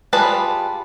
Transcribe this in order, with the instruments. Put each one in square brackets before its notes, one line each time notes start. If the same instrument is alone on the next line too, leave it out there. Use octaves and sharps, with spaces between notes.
[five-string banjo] G3 F4 G#4 B4 A5